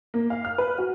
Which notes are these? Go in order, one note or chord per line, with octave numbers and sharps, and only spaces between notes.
A#3
F5
F6
B4
F#4